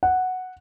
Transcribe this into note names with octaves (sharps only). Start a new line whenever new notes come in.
F#5